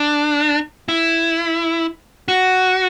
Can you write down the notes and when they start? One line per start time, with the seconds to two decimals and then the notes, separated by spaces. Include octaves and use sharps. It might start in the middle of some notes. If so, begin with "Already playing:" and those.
Already playing: D4
0.88 E4
2.28 F#4